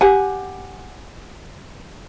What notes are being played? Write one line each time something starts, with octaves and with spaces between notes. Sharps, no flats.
G4 F#5 G#5